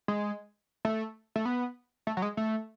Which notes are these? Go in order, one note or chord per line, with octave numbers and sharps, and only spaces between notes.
G#3
A3
A3
B3
A3
F#3
G#3
A3